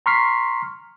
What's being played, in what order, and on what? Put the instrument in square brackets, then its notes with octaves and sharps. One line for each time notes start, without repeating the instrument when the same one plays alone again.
[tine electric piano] A#5 C6 C#6 F6 B6 C7